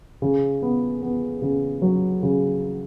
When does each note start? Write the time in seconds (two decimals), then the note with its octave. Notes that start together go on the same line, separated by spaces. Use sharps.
0.22 C#3
0.62 B3
1.02 B3
1.42 C#3
1.82 F#3
2.23 C#3